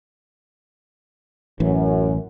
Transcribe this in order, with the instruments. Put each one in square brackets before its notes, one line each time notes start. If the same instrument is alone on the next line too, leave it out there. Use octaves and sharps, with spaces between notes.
[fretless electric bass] A1 E3 [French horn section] F#2